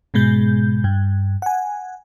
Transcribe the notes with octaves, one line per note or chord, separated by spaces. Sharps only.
G#2 B2 G#3 G6
G2
F#5 G#5